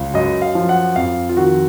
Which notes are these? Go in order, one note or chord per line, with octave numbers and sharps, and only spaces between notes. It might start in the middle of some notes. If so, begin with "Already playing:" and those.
Already playing: C#2
F#2 D#5
F5
F3
F#5
F2 F5
F4
D#3 F#4